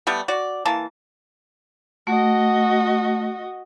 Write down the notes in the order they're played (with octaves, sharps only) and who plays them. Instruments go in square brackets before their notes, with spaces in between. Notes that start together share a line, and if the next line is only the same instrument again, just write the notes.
[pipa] G3 A3 B3
F#4 D5
E3 A#3 A5
[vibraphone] A3 [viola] F#4 D#5